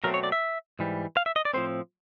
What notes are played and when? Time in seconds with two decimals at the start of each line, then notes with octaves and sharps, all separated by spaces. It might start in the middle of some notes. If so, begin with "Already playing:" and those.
0.04 B2 F#3 A3 C4 A#4
0.14 C#5
0.23 D5
0.32 E5
0.79 G#2 E3 G3
1.17 F5
1.26 E5
1.36 D#5
1.45 D5
1.53 A2 F3 G#3 C4 C5